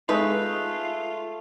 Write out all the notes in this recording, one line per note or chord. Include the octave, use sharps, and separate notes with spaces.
G#3 A3 D#4 F4 B4